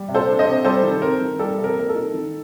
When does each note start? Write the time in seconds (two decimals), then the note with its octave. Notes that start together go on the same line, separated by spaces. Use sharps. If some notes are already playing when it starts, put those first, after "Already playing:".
Already playing: G3
0.08 C3
0.14 A4 C5
0.27 D4
0.39 C5 D#5
0.45 C3
0.64 G3 A4 C5
0.83 D#3
1.02 C4 A#4
1.21 D#3
1.39 G3 A4
1.58 C3
1.64 A#4
1.77 A#3 A#4
1.89 A4
1.95 D#4
2.14 D#3